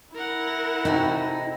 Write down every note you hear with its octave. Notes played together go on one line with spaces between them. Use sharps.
E4 A#4 F#5
C3 D#4 F#4 A4